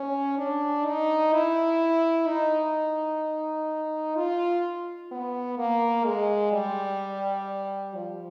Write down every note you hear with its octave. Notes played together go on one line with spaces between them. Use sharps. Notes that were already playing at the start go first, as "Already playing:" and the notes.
Already playing: C#4
D4
D#4
E4
D#4
F4
B3
A#3
G#3
G3
F3